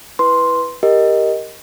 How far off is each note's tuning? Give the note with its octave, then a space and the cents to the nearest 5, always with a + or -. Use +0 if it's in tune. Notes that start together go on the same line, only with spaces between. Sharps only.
E4 +0 B4 +0 C6 +0
G4 +10 A#4 +0 D#5 +0